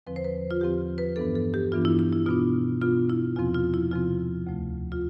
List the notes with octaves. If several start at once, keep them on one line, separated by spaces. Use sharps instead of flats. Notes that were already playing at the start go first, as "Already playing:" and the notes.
E2 D3 F3 C4 B4
C5
B4
F4
E2 D3 F3 C4 G4
B4
G2 E3 B3 D4 A4
A4
G4
G2 E3 B3 D4 F4
E4
E4
E4
B2 B3 D4 F4
B2 B3 D4 F4
E4
E2 C3 F3 C4 F4
F4
E4
E2 C3 F3 C4 F4
D2 C3 F3 A3
F4